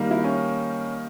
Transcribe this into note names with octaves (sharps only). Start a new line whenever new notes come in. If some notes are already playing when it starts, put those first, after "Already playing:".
Already playing: D#3 G3 A#3
E4
C#4